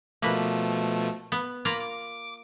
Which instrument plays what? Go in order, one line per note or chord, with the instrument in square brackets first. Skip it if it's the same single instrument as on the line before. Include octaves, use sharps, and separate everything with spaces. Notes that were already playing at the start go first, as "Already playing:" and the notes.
[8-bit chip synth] B2 F3 A3 [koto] A#3 B4
[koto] B3
[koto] A#3 F4 A#5 [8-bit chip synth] B5 D6
[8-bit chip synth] D6